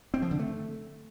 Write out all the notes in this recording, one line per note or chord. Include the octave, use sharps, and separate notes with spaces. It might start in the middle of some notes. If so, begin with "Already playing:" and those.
C4
F3
D3
A3